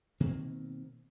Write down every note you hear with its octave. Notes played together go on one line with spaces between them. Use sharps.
B2 D#3 A#3 C4